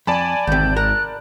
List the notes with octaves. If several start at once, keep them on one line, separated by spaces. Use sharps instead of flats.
F2 D5 G#5 A5 B5
G#1 D2 C3 G6
A#4 F#6